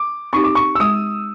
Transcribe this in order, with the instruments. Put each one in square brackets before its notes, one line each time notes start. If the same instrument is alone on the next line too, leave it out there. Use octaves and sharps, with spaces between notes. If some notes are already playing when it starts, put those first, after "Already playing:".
Already playing: [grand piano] D6
[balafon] C4 D#4 G4 [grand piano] C#6
[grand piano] D6
C#6
E6
[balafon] G#3 [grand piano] D#6